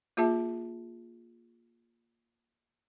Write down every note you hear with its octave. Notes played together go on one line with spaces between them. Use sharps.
A#3 F4 G#4 E5 A5